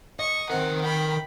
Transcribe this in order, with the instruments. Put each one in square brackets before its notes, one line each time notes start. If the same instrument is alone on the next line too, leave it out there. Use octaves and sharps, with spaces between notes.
[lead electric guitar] D#5 [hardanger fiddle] C#6
[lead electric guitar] D#3 A#4 [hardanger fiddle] C4 F#5
[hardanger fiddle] G5 B5